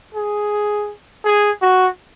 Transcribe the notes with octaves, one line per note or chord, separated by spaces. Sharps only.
G#4
G#4
F#4